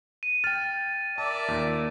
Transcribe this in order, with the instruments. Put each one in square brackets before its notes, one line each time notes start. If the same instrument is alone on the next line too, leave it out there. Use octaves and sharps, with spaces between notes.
[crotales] D#7
[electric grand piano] G5 F6 [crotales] A6
[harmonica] A#4 D5 E5 [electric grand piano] A5
[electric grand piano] D#2 A#2